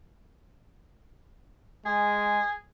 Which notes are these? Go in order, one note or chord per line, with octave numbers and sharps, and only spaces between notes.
G#3 G#4